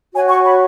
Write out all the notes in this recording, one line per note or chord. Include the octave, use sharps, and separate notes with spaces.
F#4 C#5 G#5
C#6
B5